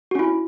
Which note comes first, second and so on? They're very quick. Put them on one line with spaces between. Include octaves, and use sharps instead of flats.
F#4 C#4 E4